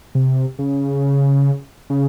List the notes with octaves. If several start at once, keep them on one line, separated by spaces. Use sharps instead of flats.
C3
C#3
C#3